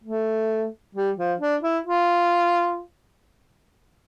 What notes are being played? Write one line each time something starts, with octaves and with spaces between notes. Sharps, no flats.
A3
G3
F3
D4
E4
F4